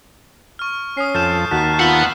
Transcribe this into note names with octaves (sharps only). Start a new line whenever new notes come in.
C#6 F6
C#4 D#6 F6 C7
F2 A4 F6 G6 E7
D#2 F#4 A5 F#6 B6
B3 F4 F#5 E6